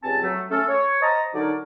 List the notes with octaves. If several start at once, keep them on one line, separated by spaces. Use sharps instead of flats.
C#2 G2 C4 G#5 A5
F#3 A3
A3 C#4 A4
C#5
C5 D#5 A5 A#5
D3 F#3 D#4 A#4 C#5 D5